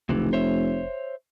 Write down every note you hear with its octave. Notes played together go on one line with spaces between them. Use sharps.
F1 C#2 C3 E3
C5 C#5 E5